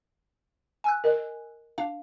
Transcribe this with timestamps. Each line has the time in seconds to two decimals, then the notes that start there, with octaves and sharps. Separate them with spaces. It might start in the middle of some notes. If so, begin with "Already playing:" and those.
0.84 G#5 E6 F#6
1.04 A#4 D#5
1.78 D4 F5